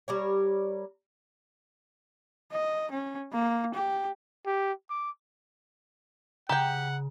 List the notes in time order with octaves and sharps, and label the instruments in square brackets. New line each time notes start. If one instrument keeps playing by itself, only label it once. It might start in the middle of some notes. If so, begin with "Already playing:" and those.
[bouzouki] G3 A#4 C#5
[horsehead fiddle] D#5
C#4
A#3
G4
[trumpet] G4
D6
[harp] C#3 [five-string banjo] G4 G5 [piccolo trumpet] F#5 [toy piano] A#5